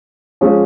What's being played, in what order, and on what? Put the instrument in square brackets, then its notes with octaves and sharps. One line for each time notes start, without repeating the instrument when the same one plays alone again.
[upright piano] F3 G#3 C#4 G#4